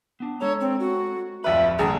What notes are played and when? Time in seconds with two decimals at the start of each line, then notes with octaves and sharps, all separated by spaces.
0.20 B3 D4
0.41 G#3 A4 C#5 A#5
0.61 C4
0.80 F#4
1.44 D1 F2 F4 B4 D5 E5 B5
1.79 A#1 G2 D3 G#4 A#5